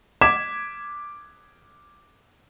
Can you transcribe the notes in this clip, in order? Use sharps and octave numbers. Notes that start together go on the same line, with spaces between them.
D6 G#6 B6 E7